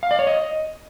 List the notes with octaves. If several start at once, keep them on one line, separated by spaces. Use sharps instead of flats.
F5
D5
C#5
D#5